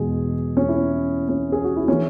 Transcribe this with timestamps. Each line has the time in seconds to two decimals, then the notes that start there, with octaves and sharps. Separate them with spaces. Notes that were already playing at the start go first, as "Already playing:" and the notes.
Already playing: E2 B2 G#3 G#4
0.57 C#4
0.68 E4
1.29 C#4
1.52 G#4
1.64 F#4
1.77 E4
1.88 E3 C#4